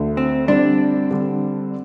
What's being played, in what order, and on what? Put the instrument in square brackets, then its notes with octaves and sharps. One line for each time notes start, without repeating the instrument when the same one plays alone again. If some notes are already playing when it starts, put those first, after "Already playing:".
Already playing: [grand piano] D2 D3 A3
[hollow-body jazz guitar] C4
[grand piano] D3 G3 C4 [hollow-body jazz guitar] D4
[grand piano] D3 G3 C4